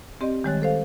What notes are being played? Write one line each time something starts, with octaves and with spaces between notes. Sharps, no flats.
C4 G4 D5 D#5
D#3 G3 G#3 C#5 F#6 A6
A4 C5 F5